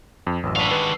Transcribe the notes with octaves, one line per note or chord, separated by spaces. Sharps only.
F2
A1 F#2 D#5 E6
G3 D4 F#4 B4 F5
D#3 G#3 B4